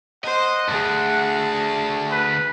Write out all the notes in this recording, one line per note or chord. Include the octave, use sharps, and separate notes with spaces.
C5 D#5 F#5
D2 G2 G#4 A5
B4